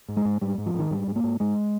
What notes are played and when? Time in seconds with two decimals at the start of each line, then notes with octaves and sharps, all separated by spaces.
0.09 G#2
0.17 G#3
0.25 G#2
0.41 G#2 G3
0.58 G#2
0.66 F3
0.74 G#2 D#3
0.91 G#2 G3
1.07 G#2
1.16 A#3
1.24 G#2
1.40 G#2 G#3